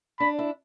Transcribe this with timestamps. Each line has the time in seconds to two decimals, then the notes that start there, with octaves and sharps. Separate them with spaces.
0.20 D4 B5
0.39 E4